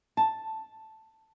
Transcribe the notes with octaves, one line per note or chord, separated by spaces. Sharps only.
A5